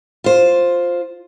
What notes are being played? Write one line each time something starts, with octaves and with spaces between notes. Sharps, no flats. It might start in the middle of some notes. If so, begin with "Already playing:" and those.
F4 C5